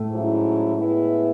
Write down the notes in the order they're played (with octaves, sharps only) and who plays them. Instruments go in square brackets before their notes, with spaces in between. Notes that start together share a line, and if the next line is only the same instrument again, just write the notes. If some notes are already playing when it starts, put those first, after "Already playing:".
Already playing: [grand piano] A2 A3
[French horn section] G#2 F#3 C#4 E4
A2 G#3 B3 E4